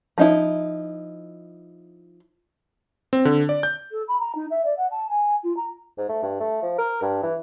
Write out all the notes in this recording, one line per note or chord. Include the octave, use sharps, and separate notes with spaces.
F3 D#4 E4
C4
D3
D5
G6
A4
B5
A#5
D#4
E5
D5
F#5
A5
G#5
F4
A#5
G#2
A3
G2
A3
F3
A#4
G2
E3